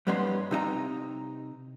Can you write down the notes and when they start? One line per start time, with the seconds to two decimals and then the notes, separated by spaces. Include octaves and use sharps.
0.07 G2 G3 B3 C#4 D#4 C6
0.51 C3 D#4 D#5 A#5